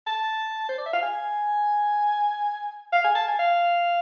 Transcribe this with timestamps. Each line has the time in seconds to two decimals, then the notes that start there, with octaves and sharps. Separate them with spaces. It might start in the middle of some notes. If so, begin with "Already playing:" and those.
0.07 A5
0.69 C5
0.78 D5
0.86 E5
0.93 F5
1.02 G#5
2.92 F5
3.04 G#5
3.15 A5
3.28 G#5
3.39 F5